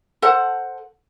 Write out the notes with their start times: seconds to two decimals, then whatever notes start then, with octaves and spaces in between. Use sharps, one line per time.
0.22 A4 C5 F#5